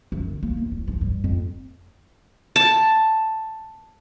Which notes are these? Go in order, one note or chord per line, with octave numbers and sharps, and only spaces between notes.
F#2
D3
A#3
E2
D1
D4
G2
F2
A5